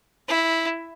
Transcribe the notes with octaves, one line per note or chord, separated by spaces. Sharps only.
E4